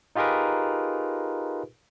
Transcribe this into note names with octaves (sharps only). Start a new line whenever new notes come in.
D#4 F4 G4 G#4 A#4 B4